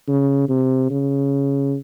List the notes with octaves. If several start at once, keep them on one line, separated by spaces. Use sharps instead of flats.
C#3
C3
C#3